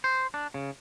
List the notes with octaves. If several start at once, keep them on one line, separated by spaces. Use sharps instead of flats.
C5
D4
C#3